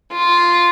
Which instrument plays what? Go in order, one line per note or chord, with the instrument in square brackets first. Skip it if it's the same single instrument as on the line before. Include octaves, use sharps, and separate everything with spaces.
[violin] F4